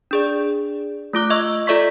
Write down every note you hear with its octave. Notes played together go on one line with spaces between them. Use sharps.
D4 G#4 D5
A3 F4 D6 F#6
D#5 C#6 E6
F4 A4 D5 E5 C#6 B6